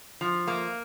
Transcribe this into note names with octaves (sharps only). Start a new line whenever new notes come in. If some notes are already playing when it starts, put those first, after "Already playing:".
F3
A#3